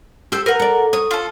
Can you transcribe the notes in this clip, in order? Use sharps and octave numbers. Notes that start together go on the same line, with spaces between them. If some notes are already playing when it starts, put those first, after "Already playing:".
G4 A4 C5 E6
A#4 B4 F#5
A4 D5
C#5 D#6
F4 A4